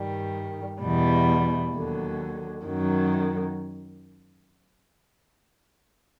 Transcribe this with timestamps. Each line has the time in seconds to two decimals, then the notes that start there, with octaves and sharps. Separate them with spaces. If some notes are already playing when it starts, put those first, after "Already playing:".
Already playing: G2 D#3 G3
0.81 E2 B2 G3
1.73 D#2 D3 F#3
2.65 F#2 D#3 F#3